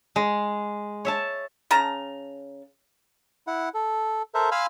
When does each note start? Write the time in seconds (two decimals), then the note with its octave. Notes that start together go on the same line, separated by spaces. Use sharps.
0.16 G#3
1.05 C#5 E5 A5
1.71 C#3 A5 A#5
3.47 E4 F#5
3.74 A4
4.35 A4 A#4 C5 E5
4.52 F5 G#5 B5 C6 E6 F6